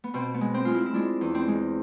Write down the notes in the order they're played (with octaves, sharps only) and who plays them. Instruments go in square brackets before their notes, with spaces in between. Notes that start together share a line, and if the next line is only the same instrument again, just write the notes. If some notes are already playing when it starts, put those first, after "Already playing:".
[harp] B3
B2 C4
B3
G#3
C4
G#3 F4
E4
E4
G#3 D4
E2
C4
G#3